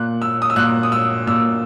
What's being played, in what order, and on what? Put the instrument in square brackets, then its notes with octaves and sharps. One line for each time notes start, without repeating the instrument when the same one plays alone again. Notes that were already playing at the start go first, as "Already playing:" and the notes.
Already playing: [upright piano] A#2 F#6
E6
D#6
E6
A#2 F#6
D#6
E6
A#2 E6